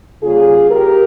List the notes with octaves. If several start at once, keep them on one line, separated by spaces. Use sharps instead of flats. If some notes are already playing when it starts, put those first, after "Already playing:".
C#3 G3 A#3 C#4 F4 G#4
G4 A#4